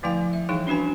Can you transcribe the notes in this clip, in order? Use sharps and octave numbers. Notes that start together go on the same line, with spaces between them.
D3 F3 A3 E4 F5 G#5
E5
E3 G3 D#4 G#4 G5 C#6
C#4 D4 F#4 B4 G#5